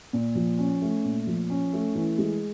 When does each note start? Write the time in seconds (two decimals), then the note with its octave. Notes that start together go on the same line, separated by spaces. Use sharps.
0.13 A#2
0.35 F3
0.59 C#4
0.82 A3
1.04 A#2
1.27 F3
1.50 C#4
1.73 A3
1.95 E3
2.18 G#3